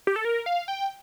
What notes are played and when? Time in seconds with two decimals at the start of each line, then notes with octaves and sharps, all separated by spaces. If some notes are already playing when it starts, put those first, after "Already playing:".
0.07 G4
0.16 A4
0.25 A#4
0.46 F5
0.68 G5